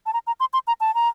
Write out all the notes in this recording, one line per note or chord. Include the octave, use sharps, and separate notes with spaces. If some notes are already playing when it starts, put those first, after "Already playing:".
A5
A#5
A#5
C6
C6
A#5
A5
A#5